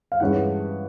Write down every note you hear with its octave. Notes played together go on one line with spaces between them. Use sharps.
F5
G2 E3 G#3 C#4 F#5